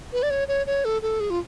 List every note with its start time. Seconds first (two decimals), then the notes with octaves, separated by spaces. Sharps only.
0.12 B4
0.23 D5
0.30 C#5
0.48 C#5
0.67 C#5
0.85 A4
1.02 A4
1.20 G#4
1.30 F4